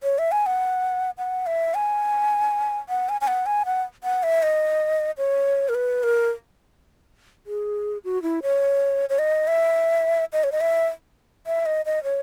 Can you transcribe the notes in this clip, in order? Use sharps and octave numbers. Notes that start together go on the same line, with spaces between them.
C#5
E5
G#5
F#5
F#5
E5
G#5
F#5
G#5
G#5
F#5
G#5
F#5
F#5
E5
D#5
C#5
A#4
B4
A#4
G#4
F#4
E4
C#5
C#5
D#5
E5
D#5
C#5
D#5
E5
E5
D#5
D#5
C#5